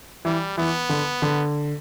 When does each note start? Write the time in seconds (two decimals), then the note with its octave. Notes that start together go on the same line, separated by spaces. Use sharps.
0.25 E3 G3
0.57 E3 B3
0.89 D3
1.22 D3